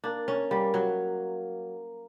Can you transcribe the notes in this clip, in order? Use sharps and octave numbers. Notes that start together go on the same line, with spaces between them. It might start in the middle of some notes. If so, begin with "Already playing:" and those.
A#3 D4
C#4
G3 A#3
F#3